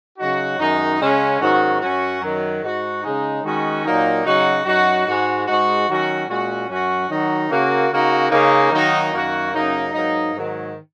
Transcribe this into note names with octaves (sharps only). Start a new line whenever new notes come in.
C#3 F#3 D#4 F#4
F#2 D#3 G#3 D#4
C#3 G#3 C#4
G#2 D#3 F#3 C#4 F#4
F#2 F#3 C#4 F#4
F#2 D#3 F#3
G#2 G#3 D#4 F#4
C#3 G#3 D#4
D#3 G#3 C#4 F#4
A#2 F#3 A#3 D#4
C#3 F#3 D#4 F#4
F#2 F#3 D#4 F#4
G#2 G#3 F#4
G#2 G#3 D#4 F#4
D#3 F#3 C#4 F#4
A#2 G#3 C#4 F#4
F#2 F#3 C#4 F#4
D#3 F#3 D#4 F#4
C#3 A#3 F#4
C#3 A#3 D#4 F#4
C#3 A#3 D#4
D#3 F#3 A#3 D#4 F#4
F#2 D#3 A#3 F#4
F#2 C#3 A#3 D#4
G#2 F#3 A#3 D#4
G#2 D#3 F#3